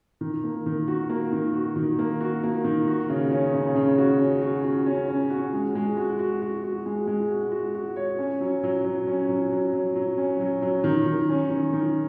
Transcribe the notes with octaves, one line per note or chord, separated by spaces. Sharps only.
D#3
A#3
D#3
F#4
A#3
D#3
F#4
D#3
A#3
F#4
A#3
D#3
F#4
C#3
C#4
C#3
C#3
F#4
C#4
F#4
F#4
C#4
C#4
F#4
G#3
G#3
F#4
F#4
F#4
F#4
G#3
G#3
F#4
F#4
F#4
C#5
C#4
F#3
F#3
F#3
C#4
F#3
F#3
F#3
F#3
C#4
F#3
F#3
D#3
D#3
C#4
D#3
D#3